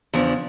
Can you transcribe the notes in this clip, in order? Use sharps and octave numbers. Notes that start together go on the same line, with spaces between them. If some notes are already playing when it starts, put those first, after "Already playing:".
E2 C#3 F3 D4